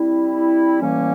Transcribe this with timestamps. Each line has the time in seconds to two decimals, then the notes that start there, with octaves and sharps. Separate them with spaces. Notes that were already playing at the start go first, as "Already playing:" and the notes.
Already playing: G3 C4 E4
0.80 A2 E3 G3 A#3 C#4